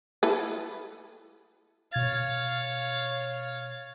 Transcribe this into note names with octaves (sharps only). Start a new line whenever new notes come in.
E4 A4 B4
B2 C#5 F5 G#6 A6